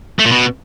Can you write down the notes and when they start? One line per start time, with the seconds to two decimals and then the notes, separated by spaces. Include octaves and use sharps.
0.19 A3
0.25 A#2
0.32 B2